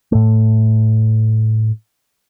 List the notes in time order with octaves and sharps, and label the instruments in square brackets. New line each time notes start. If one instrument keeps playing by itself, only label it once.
[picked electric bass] A2 A3